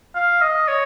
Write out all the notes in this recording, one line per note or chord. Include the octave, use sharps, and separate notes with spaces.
F5
D#5
C#5